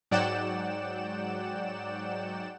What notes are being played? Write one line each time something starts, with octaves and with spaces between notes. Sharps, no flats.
G#2 F#3 D5 F#5 G5 E7